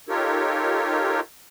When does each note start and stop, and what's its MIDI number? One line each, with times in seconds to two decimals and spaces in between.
0.09 1.20 63
0.09 1.20 65
0.09 1.20 67
0.09 1.20 69
0.09 1.20 70
0.09 1.20 73